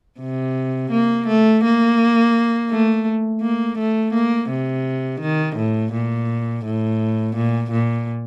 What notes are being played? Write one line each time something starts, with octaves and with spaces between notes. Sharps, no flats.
C3
A#3
A3
A#3
A3
A#3
A3
A#3
C3
D#3
A2
A#2
A2
A#2
A#2